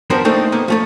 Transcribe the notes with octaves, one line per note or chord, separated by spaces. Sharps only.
F3 G3 B3 D4 A#4 C5
A3 A#3 C4 D4 D#4 A4
A#3 B3 D#5
F3 A3 A4